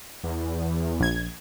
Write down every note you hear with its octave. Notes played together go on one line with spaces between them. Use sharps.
E2
A#1 G#6